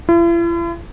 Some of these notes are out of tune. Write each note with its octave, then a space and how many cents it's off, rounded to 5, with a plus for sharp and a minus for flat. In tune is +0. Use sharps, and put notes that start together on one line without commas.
E4 +45